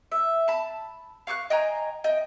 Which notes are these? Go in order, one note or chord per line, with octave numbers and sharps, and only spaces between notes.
E5
A5 B5
F5 C#6 D6 F#6
D#5 G5 G#5 A#5
D#5 G5